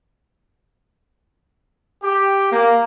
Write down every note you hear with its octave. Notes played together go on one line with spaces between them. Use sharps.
G4
A#3